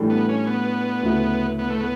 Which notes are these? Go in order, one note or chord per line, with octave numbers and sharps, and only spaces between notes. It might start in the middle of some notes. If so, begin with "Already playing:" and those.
Already playing: A2 E3 G3 D4 A4
B3
C#4
B3
D2 C#3 F#3 A3 E4
B3
A3
B3